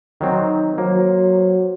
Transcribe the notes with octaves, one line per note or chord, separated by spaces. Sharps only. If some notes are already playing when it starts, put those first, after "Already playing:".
D#3 F#3 C4 D#4
F#3 A#3 C5